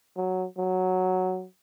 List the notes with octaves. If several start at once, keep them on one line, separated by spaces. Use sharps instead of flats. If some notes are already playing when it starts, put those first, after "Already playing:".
F#3
F#3